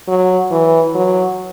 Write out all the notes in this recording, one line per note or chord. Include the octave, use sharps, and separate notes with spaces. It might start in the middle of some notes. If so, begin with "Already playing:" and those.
F#3
E3
F#3